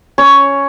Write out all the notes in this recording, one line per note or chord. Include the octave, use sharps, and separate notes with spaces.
C#4 C#5